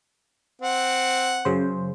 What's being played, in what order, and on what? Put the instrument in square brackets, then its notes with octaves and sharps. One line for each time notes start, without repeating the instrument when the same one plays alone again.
[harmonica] C4 F#5
[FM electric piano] F#2 C#3 C5